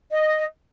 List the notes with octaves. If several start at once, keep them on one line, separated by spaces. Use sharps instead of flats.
D#5